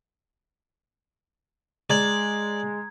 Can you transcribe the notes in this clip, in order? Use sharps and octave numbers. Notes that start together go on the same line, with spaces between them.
G#3 D5 A#5 G#6